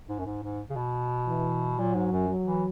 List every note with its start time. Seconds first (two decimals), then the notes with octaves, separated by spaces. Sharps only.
0.09 G#2
0.19 F#2
0.25 G#2
0.43 G#2
0.70 C#3
0.76 B2
1.27 E3
1.78 A#2 F#3
1.95 G#2
2.12 F#2
2.29 F#3
2.46 E3